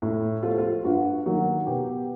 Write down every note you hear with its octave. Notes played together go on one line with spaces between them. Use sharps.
A2
F3 A3 F4
F4
G2 F#4
D#3 F#3 A#3
B2 G4